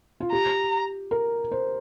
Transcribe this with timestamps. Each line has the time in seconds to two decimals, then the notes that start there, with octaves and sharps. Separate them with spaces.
0.20 F4
0.32 G4 A#5
1.11 A#4
1.52 C5